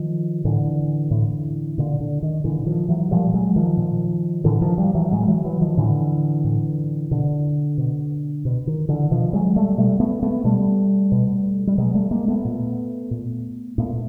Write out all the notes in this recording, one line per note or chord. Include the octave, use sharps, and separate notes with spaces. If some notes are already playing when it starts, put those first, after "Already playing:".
Already playing: D#3 F3
A2 D3 E3
A2
A#2 D3
D3
D#3
A#2 D3 E3
D#3 F3
E3 F#3
A#2 F3 G3
F#3 G#3
D#3 F3
A#2
A2 D3 E3
D#3 F3
F3 G3
E3 F#3
A2 F#3 G#3
G3
E3 F#3
E3 F#3
D#3 F3
A2 D3 E3
A2
B2 D3
B2
B2
D#3
D3 E3
B2 D#3 F3
F#3 G#3
G3 A3
B2 G3 A3
A3 B3
A3 B3
B2 G3 A3
B2
G3
B2 F#3 G#3
G3 A3
G#3 A#3
A3 B3
A#2
A#2
A#2 A3 B3